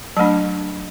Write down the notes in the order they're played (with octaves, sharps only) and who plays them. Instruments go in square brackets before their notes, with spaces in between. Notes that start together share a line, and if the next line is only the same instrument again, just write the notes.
[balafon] F#3 A3 D4 A5